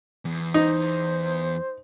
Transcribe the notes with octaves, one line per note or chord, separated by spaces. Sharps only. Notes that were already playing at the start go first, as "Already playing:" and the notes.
E2
D#4 C5